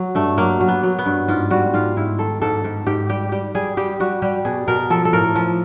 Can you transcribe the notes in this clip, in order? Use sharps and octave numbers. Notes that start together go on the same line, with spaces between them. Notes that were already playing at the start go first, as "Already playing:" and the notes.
Already playing: F#3
G2 A3
F#3 A#3
F#3
B3
F#3
B3
G2
G#2 F4
G3 F#4
G#2 F4
G#2 E4
D#3 A4
G#2 A4
G#2
G#2 G4
G3 G4
G3 G4
G3 G#4
G3 G4
G3 F#4
G3 G4
B2 G#4
B2 A#4
F3 A4
A4
A2 A#4
F3